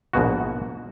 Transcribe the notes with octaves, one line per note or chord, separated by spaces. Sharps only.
A#1 G#2 B2 F#4